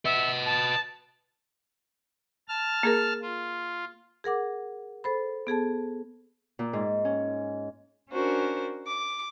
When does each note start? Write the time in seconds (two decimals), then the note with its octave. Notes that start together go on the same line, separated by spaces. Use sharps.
0.05 B4 D#5 E5
0.46 A5
2.48 A5 F6
2.83 A#3 G#4 A#4
3.22 F4
4.24 G#4 A#4 F#5 D6
5.04 A4 C5 B5
5.47 B3 G#4 A4 A5
6.59 A#2
6.73 G#2
7.05 C#4
8.12 C#4 D4 F#4 A#4 C5
8.86 D6